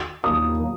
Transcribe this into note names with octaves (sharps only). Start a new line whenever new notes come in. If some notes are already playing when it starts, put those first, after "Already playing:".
D#2 D#3 F#3 A#3 D#4 D#6